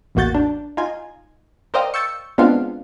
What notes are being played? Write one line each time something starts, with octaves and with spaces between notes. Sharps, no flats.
A1 E2 A#3 F#4 G6 A6
D4
D#4 F4 G#5
A#4 C5 D5 D#5 F5 G5
C#6 E6 G6 A6 C#7
G#3 B3 C4 D4 F4 F5